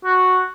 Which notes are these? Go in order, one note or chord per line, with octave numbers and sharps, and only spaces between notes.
F#4